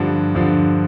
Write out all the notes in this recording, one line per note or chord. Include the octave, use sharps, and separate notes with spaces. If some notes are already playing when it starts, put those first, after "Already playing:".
Already playing: G2 D3 F3
G2 D3 F3